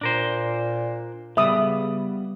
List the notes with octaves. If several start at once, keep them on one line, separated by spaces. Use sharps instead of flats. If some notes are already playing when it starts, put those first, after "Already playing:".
A#2 D4 A#4 C5
C#3 G3 B3 E5 D#6